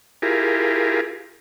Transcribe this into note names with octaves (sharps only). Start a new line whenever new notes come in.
E4 F4 G4 G#4 A#4